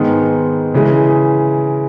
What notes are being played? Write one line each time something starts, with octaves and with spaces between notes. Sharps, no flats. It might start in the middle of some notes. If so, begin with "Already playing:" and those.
Already playing: G#2 D#3 G#3 B3
C#3 E3 G#3